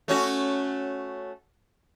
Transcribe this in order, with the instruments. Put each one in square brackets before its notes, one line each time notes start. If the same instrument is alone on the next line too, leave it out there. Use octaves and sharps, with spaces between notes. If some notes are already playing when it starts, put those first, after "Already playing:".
[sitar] A3 C#4 F#4